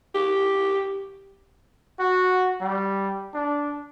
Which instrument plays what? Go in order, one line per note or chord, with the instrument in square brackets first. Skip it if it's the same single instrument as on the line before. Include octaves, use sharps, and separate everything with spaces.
[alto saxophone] G4
[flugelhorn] F#4
G3
D4